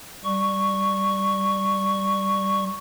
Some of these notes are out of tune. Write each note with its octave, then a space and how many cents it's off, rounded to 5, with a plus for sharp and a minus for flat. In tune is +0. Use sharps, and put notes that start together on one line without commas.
G3 +0 C#6 +0